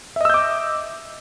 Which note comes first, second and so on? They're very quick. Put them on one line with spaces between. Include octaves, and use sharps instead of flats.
E5 D#5 E6 G6 D6